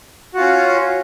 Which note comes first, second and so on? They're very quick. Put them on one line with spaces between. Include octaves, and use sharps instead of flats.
F#4 F4 C#4